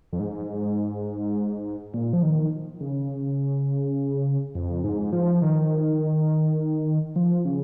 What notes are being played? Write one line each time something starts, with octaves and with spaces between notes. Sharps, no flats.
F2
G#2
A#2
F3
D#3
C#3
F2
G#2
F3
D#3
F3
C#3